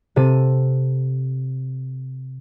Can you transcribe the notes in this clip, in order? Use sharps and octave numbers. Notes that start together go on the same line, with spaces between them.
C3 A4 D#7